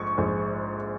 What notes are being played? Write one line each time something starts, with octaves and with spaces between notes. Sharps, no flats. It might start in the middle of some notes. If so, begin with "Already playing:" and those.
Already playing: A#1 G#2 G#3 C#6
A#1 G#2 G#3